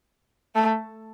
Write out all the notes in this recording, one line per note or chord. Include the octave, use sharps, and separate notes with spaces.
A3